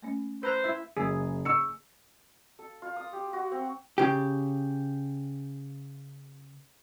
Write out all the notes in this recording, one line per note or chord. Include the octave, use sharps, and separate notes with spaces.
A3 A#3 C#4
B4 C5 A#5 E6 F#6
E4 E5
F#1 G#4
C#6 E6 C#7
A4
F4
D#6
G4
F#4
C4
C#3 G4